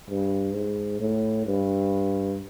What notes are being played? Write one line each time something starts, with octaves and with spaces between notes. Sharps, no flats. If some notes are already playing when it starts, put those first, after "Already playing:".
G2
G#2
A2
G2